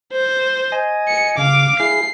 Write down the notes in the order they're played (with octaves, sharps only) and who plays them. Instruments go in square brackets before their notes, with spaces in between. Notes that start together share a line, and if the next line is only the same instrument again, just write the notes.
[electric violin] C5
[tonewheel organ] D#5 G#5
[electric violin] C#7
[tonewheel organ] C#3 [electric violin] F5 D6
[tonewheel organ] E4 G#4 [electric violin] C7